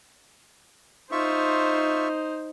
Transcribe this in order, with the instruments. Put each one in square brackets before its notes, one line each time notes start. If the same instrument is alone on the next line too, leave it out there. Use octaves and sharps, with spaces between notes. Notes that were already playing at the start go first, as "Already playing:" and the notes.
[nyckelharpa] D#4 C5 [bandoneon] F4 E5 C#6